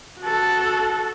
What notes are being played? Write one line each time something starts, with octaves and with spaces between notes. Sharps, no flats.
F#4 A4